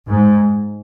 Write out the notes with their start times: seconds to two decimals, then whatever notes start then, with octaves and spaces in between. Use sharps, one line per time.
0.09 G#2